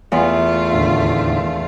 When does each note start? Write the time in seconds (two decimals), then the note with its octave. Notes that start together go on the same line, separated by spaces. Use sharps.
0.12 E2 A3 F4
0.73 D#2 A2 D3